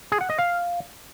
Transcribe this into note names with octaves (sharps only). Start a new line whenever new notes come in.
G#4
F#5
D#5
F5